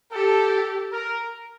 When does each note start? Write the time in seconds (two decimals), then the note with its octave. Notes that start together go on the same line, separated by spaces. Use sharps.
0.12 G4 A4
0.93 A#4